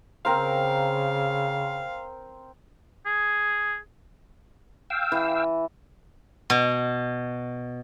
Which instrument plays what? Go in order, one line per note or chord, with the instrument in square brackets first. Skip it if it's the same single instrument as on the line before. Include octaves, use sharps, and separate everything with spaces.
[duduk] C#3 [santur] C4 A#4 C5 [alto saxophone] F5
[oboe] G#4
[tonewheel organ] F5 G5 E6
[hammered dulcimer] E3
[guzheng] B2